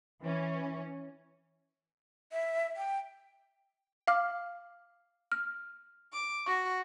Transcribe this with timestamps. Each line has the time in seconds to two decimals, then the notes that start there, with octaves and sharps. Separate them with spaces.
0.23 E3 C#4
2.32 E5
2.77 G5
4.08 F5 D6 F6
5.32 F6
6.12 D6
6.46 F#4 C#6